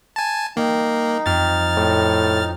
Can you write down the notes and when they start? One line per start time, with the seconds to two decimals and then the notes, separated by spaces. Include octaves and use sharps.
0.16 G#5 A5
0.57 G3 A#3 D#4
1.26 F2 F6 A6
1.77 A2